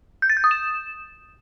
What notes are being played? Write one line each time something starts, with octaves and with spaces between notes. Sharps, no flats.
G6
A6
G6
D#6
E7